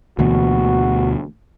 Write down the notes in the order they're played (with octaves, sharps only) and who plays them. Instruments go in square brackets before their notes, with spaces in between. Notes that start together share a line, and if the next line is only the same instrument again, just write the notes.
[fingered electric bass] D2 B2 [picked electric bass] D3 E3 A#3 [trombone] F#4